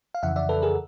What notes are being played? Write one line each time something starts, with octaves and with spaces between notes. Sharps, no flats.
F5
F2 C#3 E3 E5 F#5
D5 E5
A4 B4
G#4 A#4